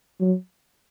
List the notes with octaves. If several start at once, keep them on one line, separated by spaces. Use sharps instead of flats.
F#3